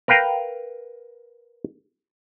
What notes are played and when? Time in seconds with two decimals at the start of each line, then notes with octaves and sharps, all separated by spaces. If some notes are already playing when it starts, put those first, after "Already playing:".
0.08 A#4 B4 F5 G5 A#5